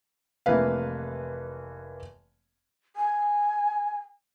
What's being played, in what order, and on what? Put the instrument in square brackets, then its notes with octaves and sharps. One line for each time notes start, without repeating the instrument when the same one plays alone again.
[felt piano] F1 E3 A#3 B4 F5
[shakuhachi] G#5